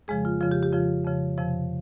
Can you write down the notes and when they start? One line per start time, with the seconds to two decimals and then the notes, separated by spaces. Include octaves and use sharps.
0.08 F2 C#3 F3 G#3 G#4
0.25 F4
0.41 F2 C#3 F3 F4
0.51 G4
0.63 G4
0.72 F2 C#3 F3 F4
1.04 F2 C#3 F3
1.38 F2 C3 F3